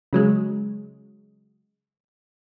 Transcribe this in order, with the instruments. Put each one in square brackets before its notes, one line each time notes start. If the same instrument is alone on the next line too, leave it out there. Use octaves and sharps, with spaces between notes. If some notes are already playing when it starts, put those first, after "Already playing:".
[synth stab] C#3 F#3 G#3